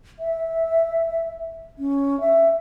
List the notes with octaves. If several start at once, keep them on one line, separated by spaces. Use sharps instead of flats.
E5
C#4
E5